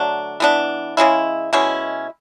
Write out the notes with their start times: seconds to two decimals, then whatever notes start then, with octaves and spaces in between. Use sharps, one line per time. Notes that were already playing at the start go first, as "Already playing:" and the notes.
Already playing: D3 F#3 A3 D4
0.40 E3 B3 D4
0.97 C#3 G#3 C#4 E4
1.53 B2 G#3 C#4 E4